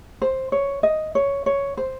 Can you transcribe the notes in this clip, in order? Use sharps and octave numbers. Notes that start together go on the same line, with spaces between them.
C5
C#5
D#5
C#5
C#5
C5